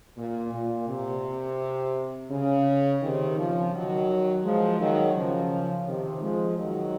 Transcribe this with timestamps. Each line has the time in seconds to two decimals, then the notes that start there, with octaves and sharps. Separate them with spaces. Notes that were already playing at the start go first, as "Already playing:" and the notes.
0.17 A#2
0.53 A#2
0.88 C3
2.31 C#3
3.02 C3 D#3
3.37 C#3 F3
3.73 D#3 F#3
4.44 F3 G#3
4.80 D#3 F#3
5.15 C#3 F3
5.86 C3 D#3
6.22 F3 G#3
6.57 D#3 F#3